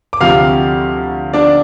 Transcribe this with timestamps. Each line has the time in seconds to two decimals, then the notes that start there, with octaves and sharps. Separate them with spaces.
0.13 D6
0.20 D2 C3 F3 F5 F6
1.34 D4 D5